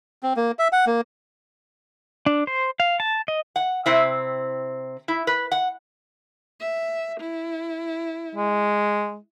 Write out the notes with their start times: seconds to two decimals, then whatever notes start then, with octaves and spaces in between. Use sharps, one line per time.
0.23 C4
0.36 A#3
0.59 E5
0.72 F#5
0.87 A#3
2.26 D4
2.47 C5
2.80 F5
3.00 A5
3.28 D#5
3.56 F#5
3.86 C3 C4 E4
5.08 E4
5.27 B4
5.52 F#5
6.60 E5
7.20 E4
8.36 G#3